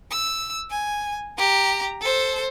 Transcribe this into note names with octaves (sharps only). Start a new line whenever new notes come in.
E6
G#5
G4 A#5
A4 C5